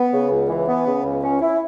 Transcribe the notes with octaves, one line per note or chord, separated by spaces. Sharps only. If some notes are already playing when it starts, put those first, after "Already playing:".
Already playing: B3
C#3
C#2
E3
B3
C#3
C#2
C#4
E4